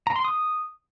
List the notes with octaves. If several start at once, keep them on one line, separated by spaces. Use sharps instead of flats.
A#5
C6
D#6